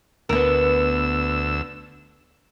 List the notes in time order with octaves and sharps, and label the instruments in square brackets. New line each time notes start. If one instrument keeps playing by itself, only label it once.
[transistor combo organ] D2 E6 [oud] B3 A#4